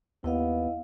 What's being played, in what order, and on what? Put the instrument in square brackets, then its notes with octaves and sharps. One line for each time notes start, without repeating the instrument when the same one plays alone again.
[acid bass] D#2 [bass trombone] B3 [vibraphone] E4 D#5 F5